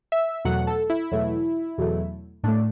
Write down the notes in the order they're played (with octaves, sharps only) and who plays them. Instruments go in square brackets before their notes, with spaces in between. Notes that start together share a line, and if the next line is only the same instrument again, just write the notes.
[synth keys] E5
E2 B2 F#3 A3 F#5
A4
E4
E2 B2 F#3 A3
E2 B2 F#3 A3
A2 A3 D4